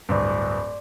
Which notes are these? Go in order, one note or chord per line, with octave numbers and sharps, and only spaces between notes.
D1 G2 D5 C6 D6